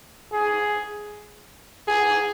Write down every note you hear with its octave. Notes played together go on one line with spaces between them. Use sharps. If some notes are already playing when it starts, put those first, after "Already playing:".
G#4
G#4